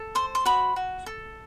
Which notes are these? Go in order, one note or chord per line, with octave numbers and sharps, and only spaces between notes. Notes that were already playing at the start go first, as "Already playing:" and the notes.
Already playing: A4
C5 C6
C6
F#4 B5
F#4
A4